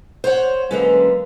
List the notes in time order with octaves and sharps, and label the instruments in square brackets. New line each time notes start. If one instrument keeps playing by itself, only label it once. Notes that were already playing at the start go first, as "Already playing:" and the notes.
[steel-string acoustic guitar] C5 C#5 F#5
[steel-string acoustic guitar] D3 G#3 C#4 [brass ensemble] F#3 A#3 B4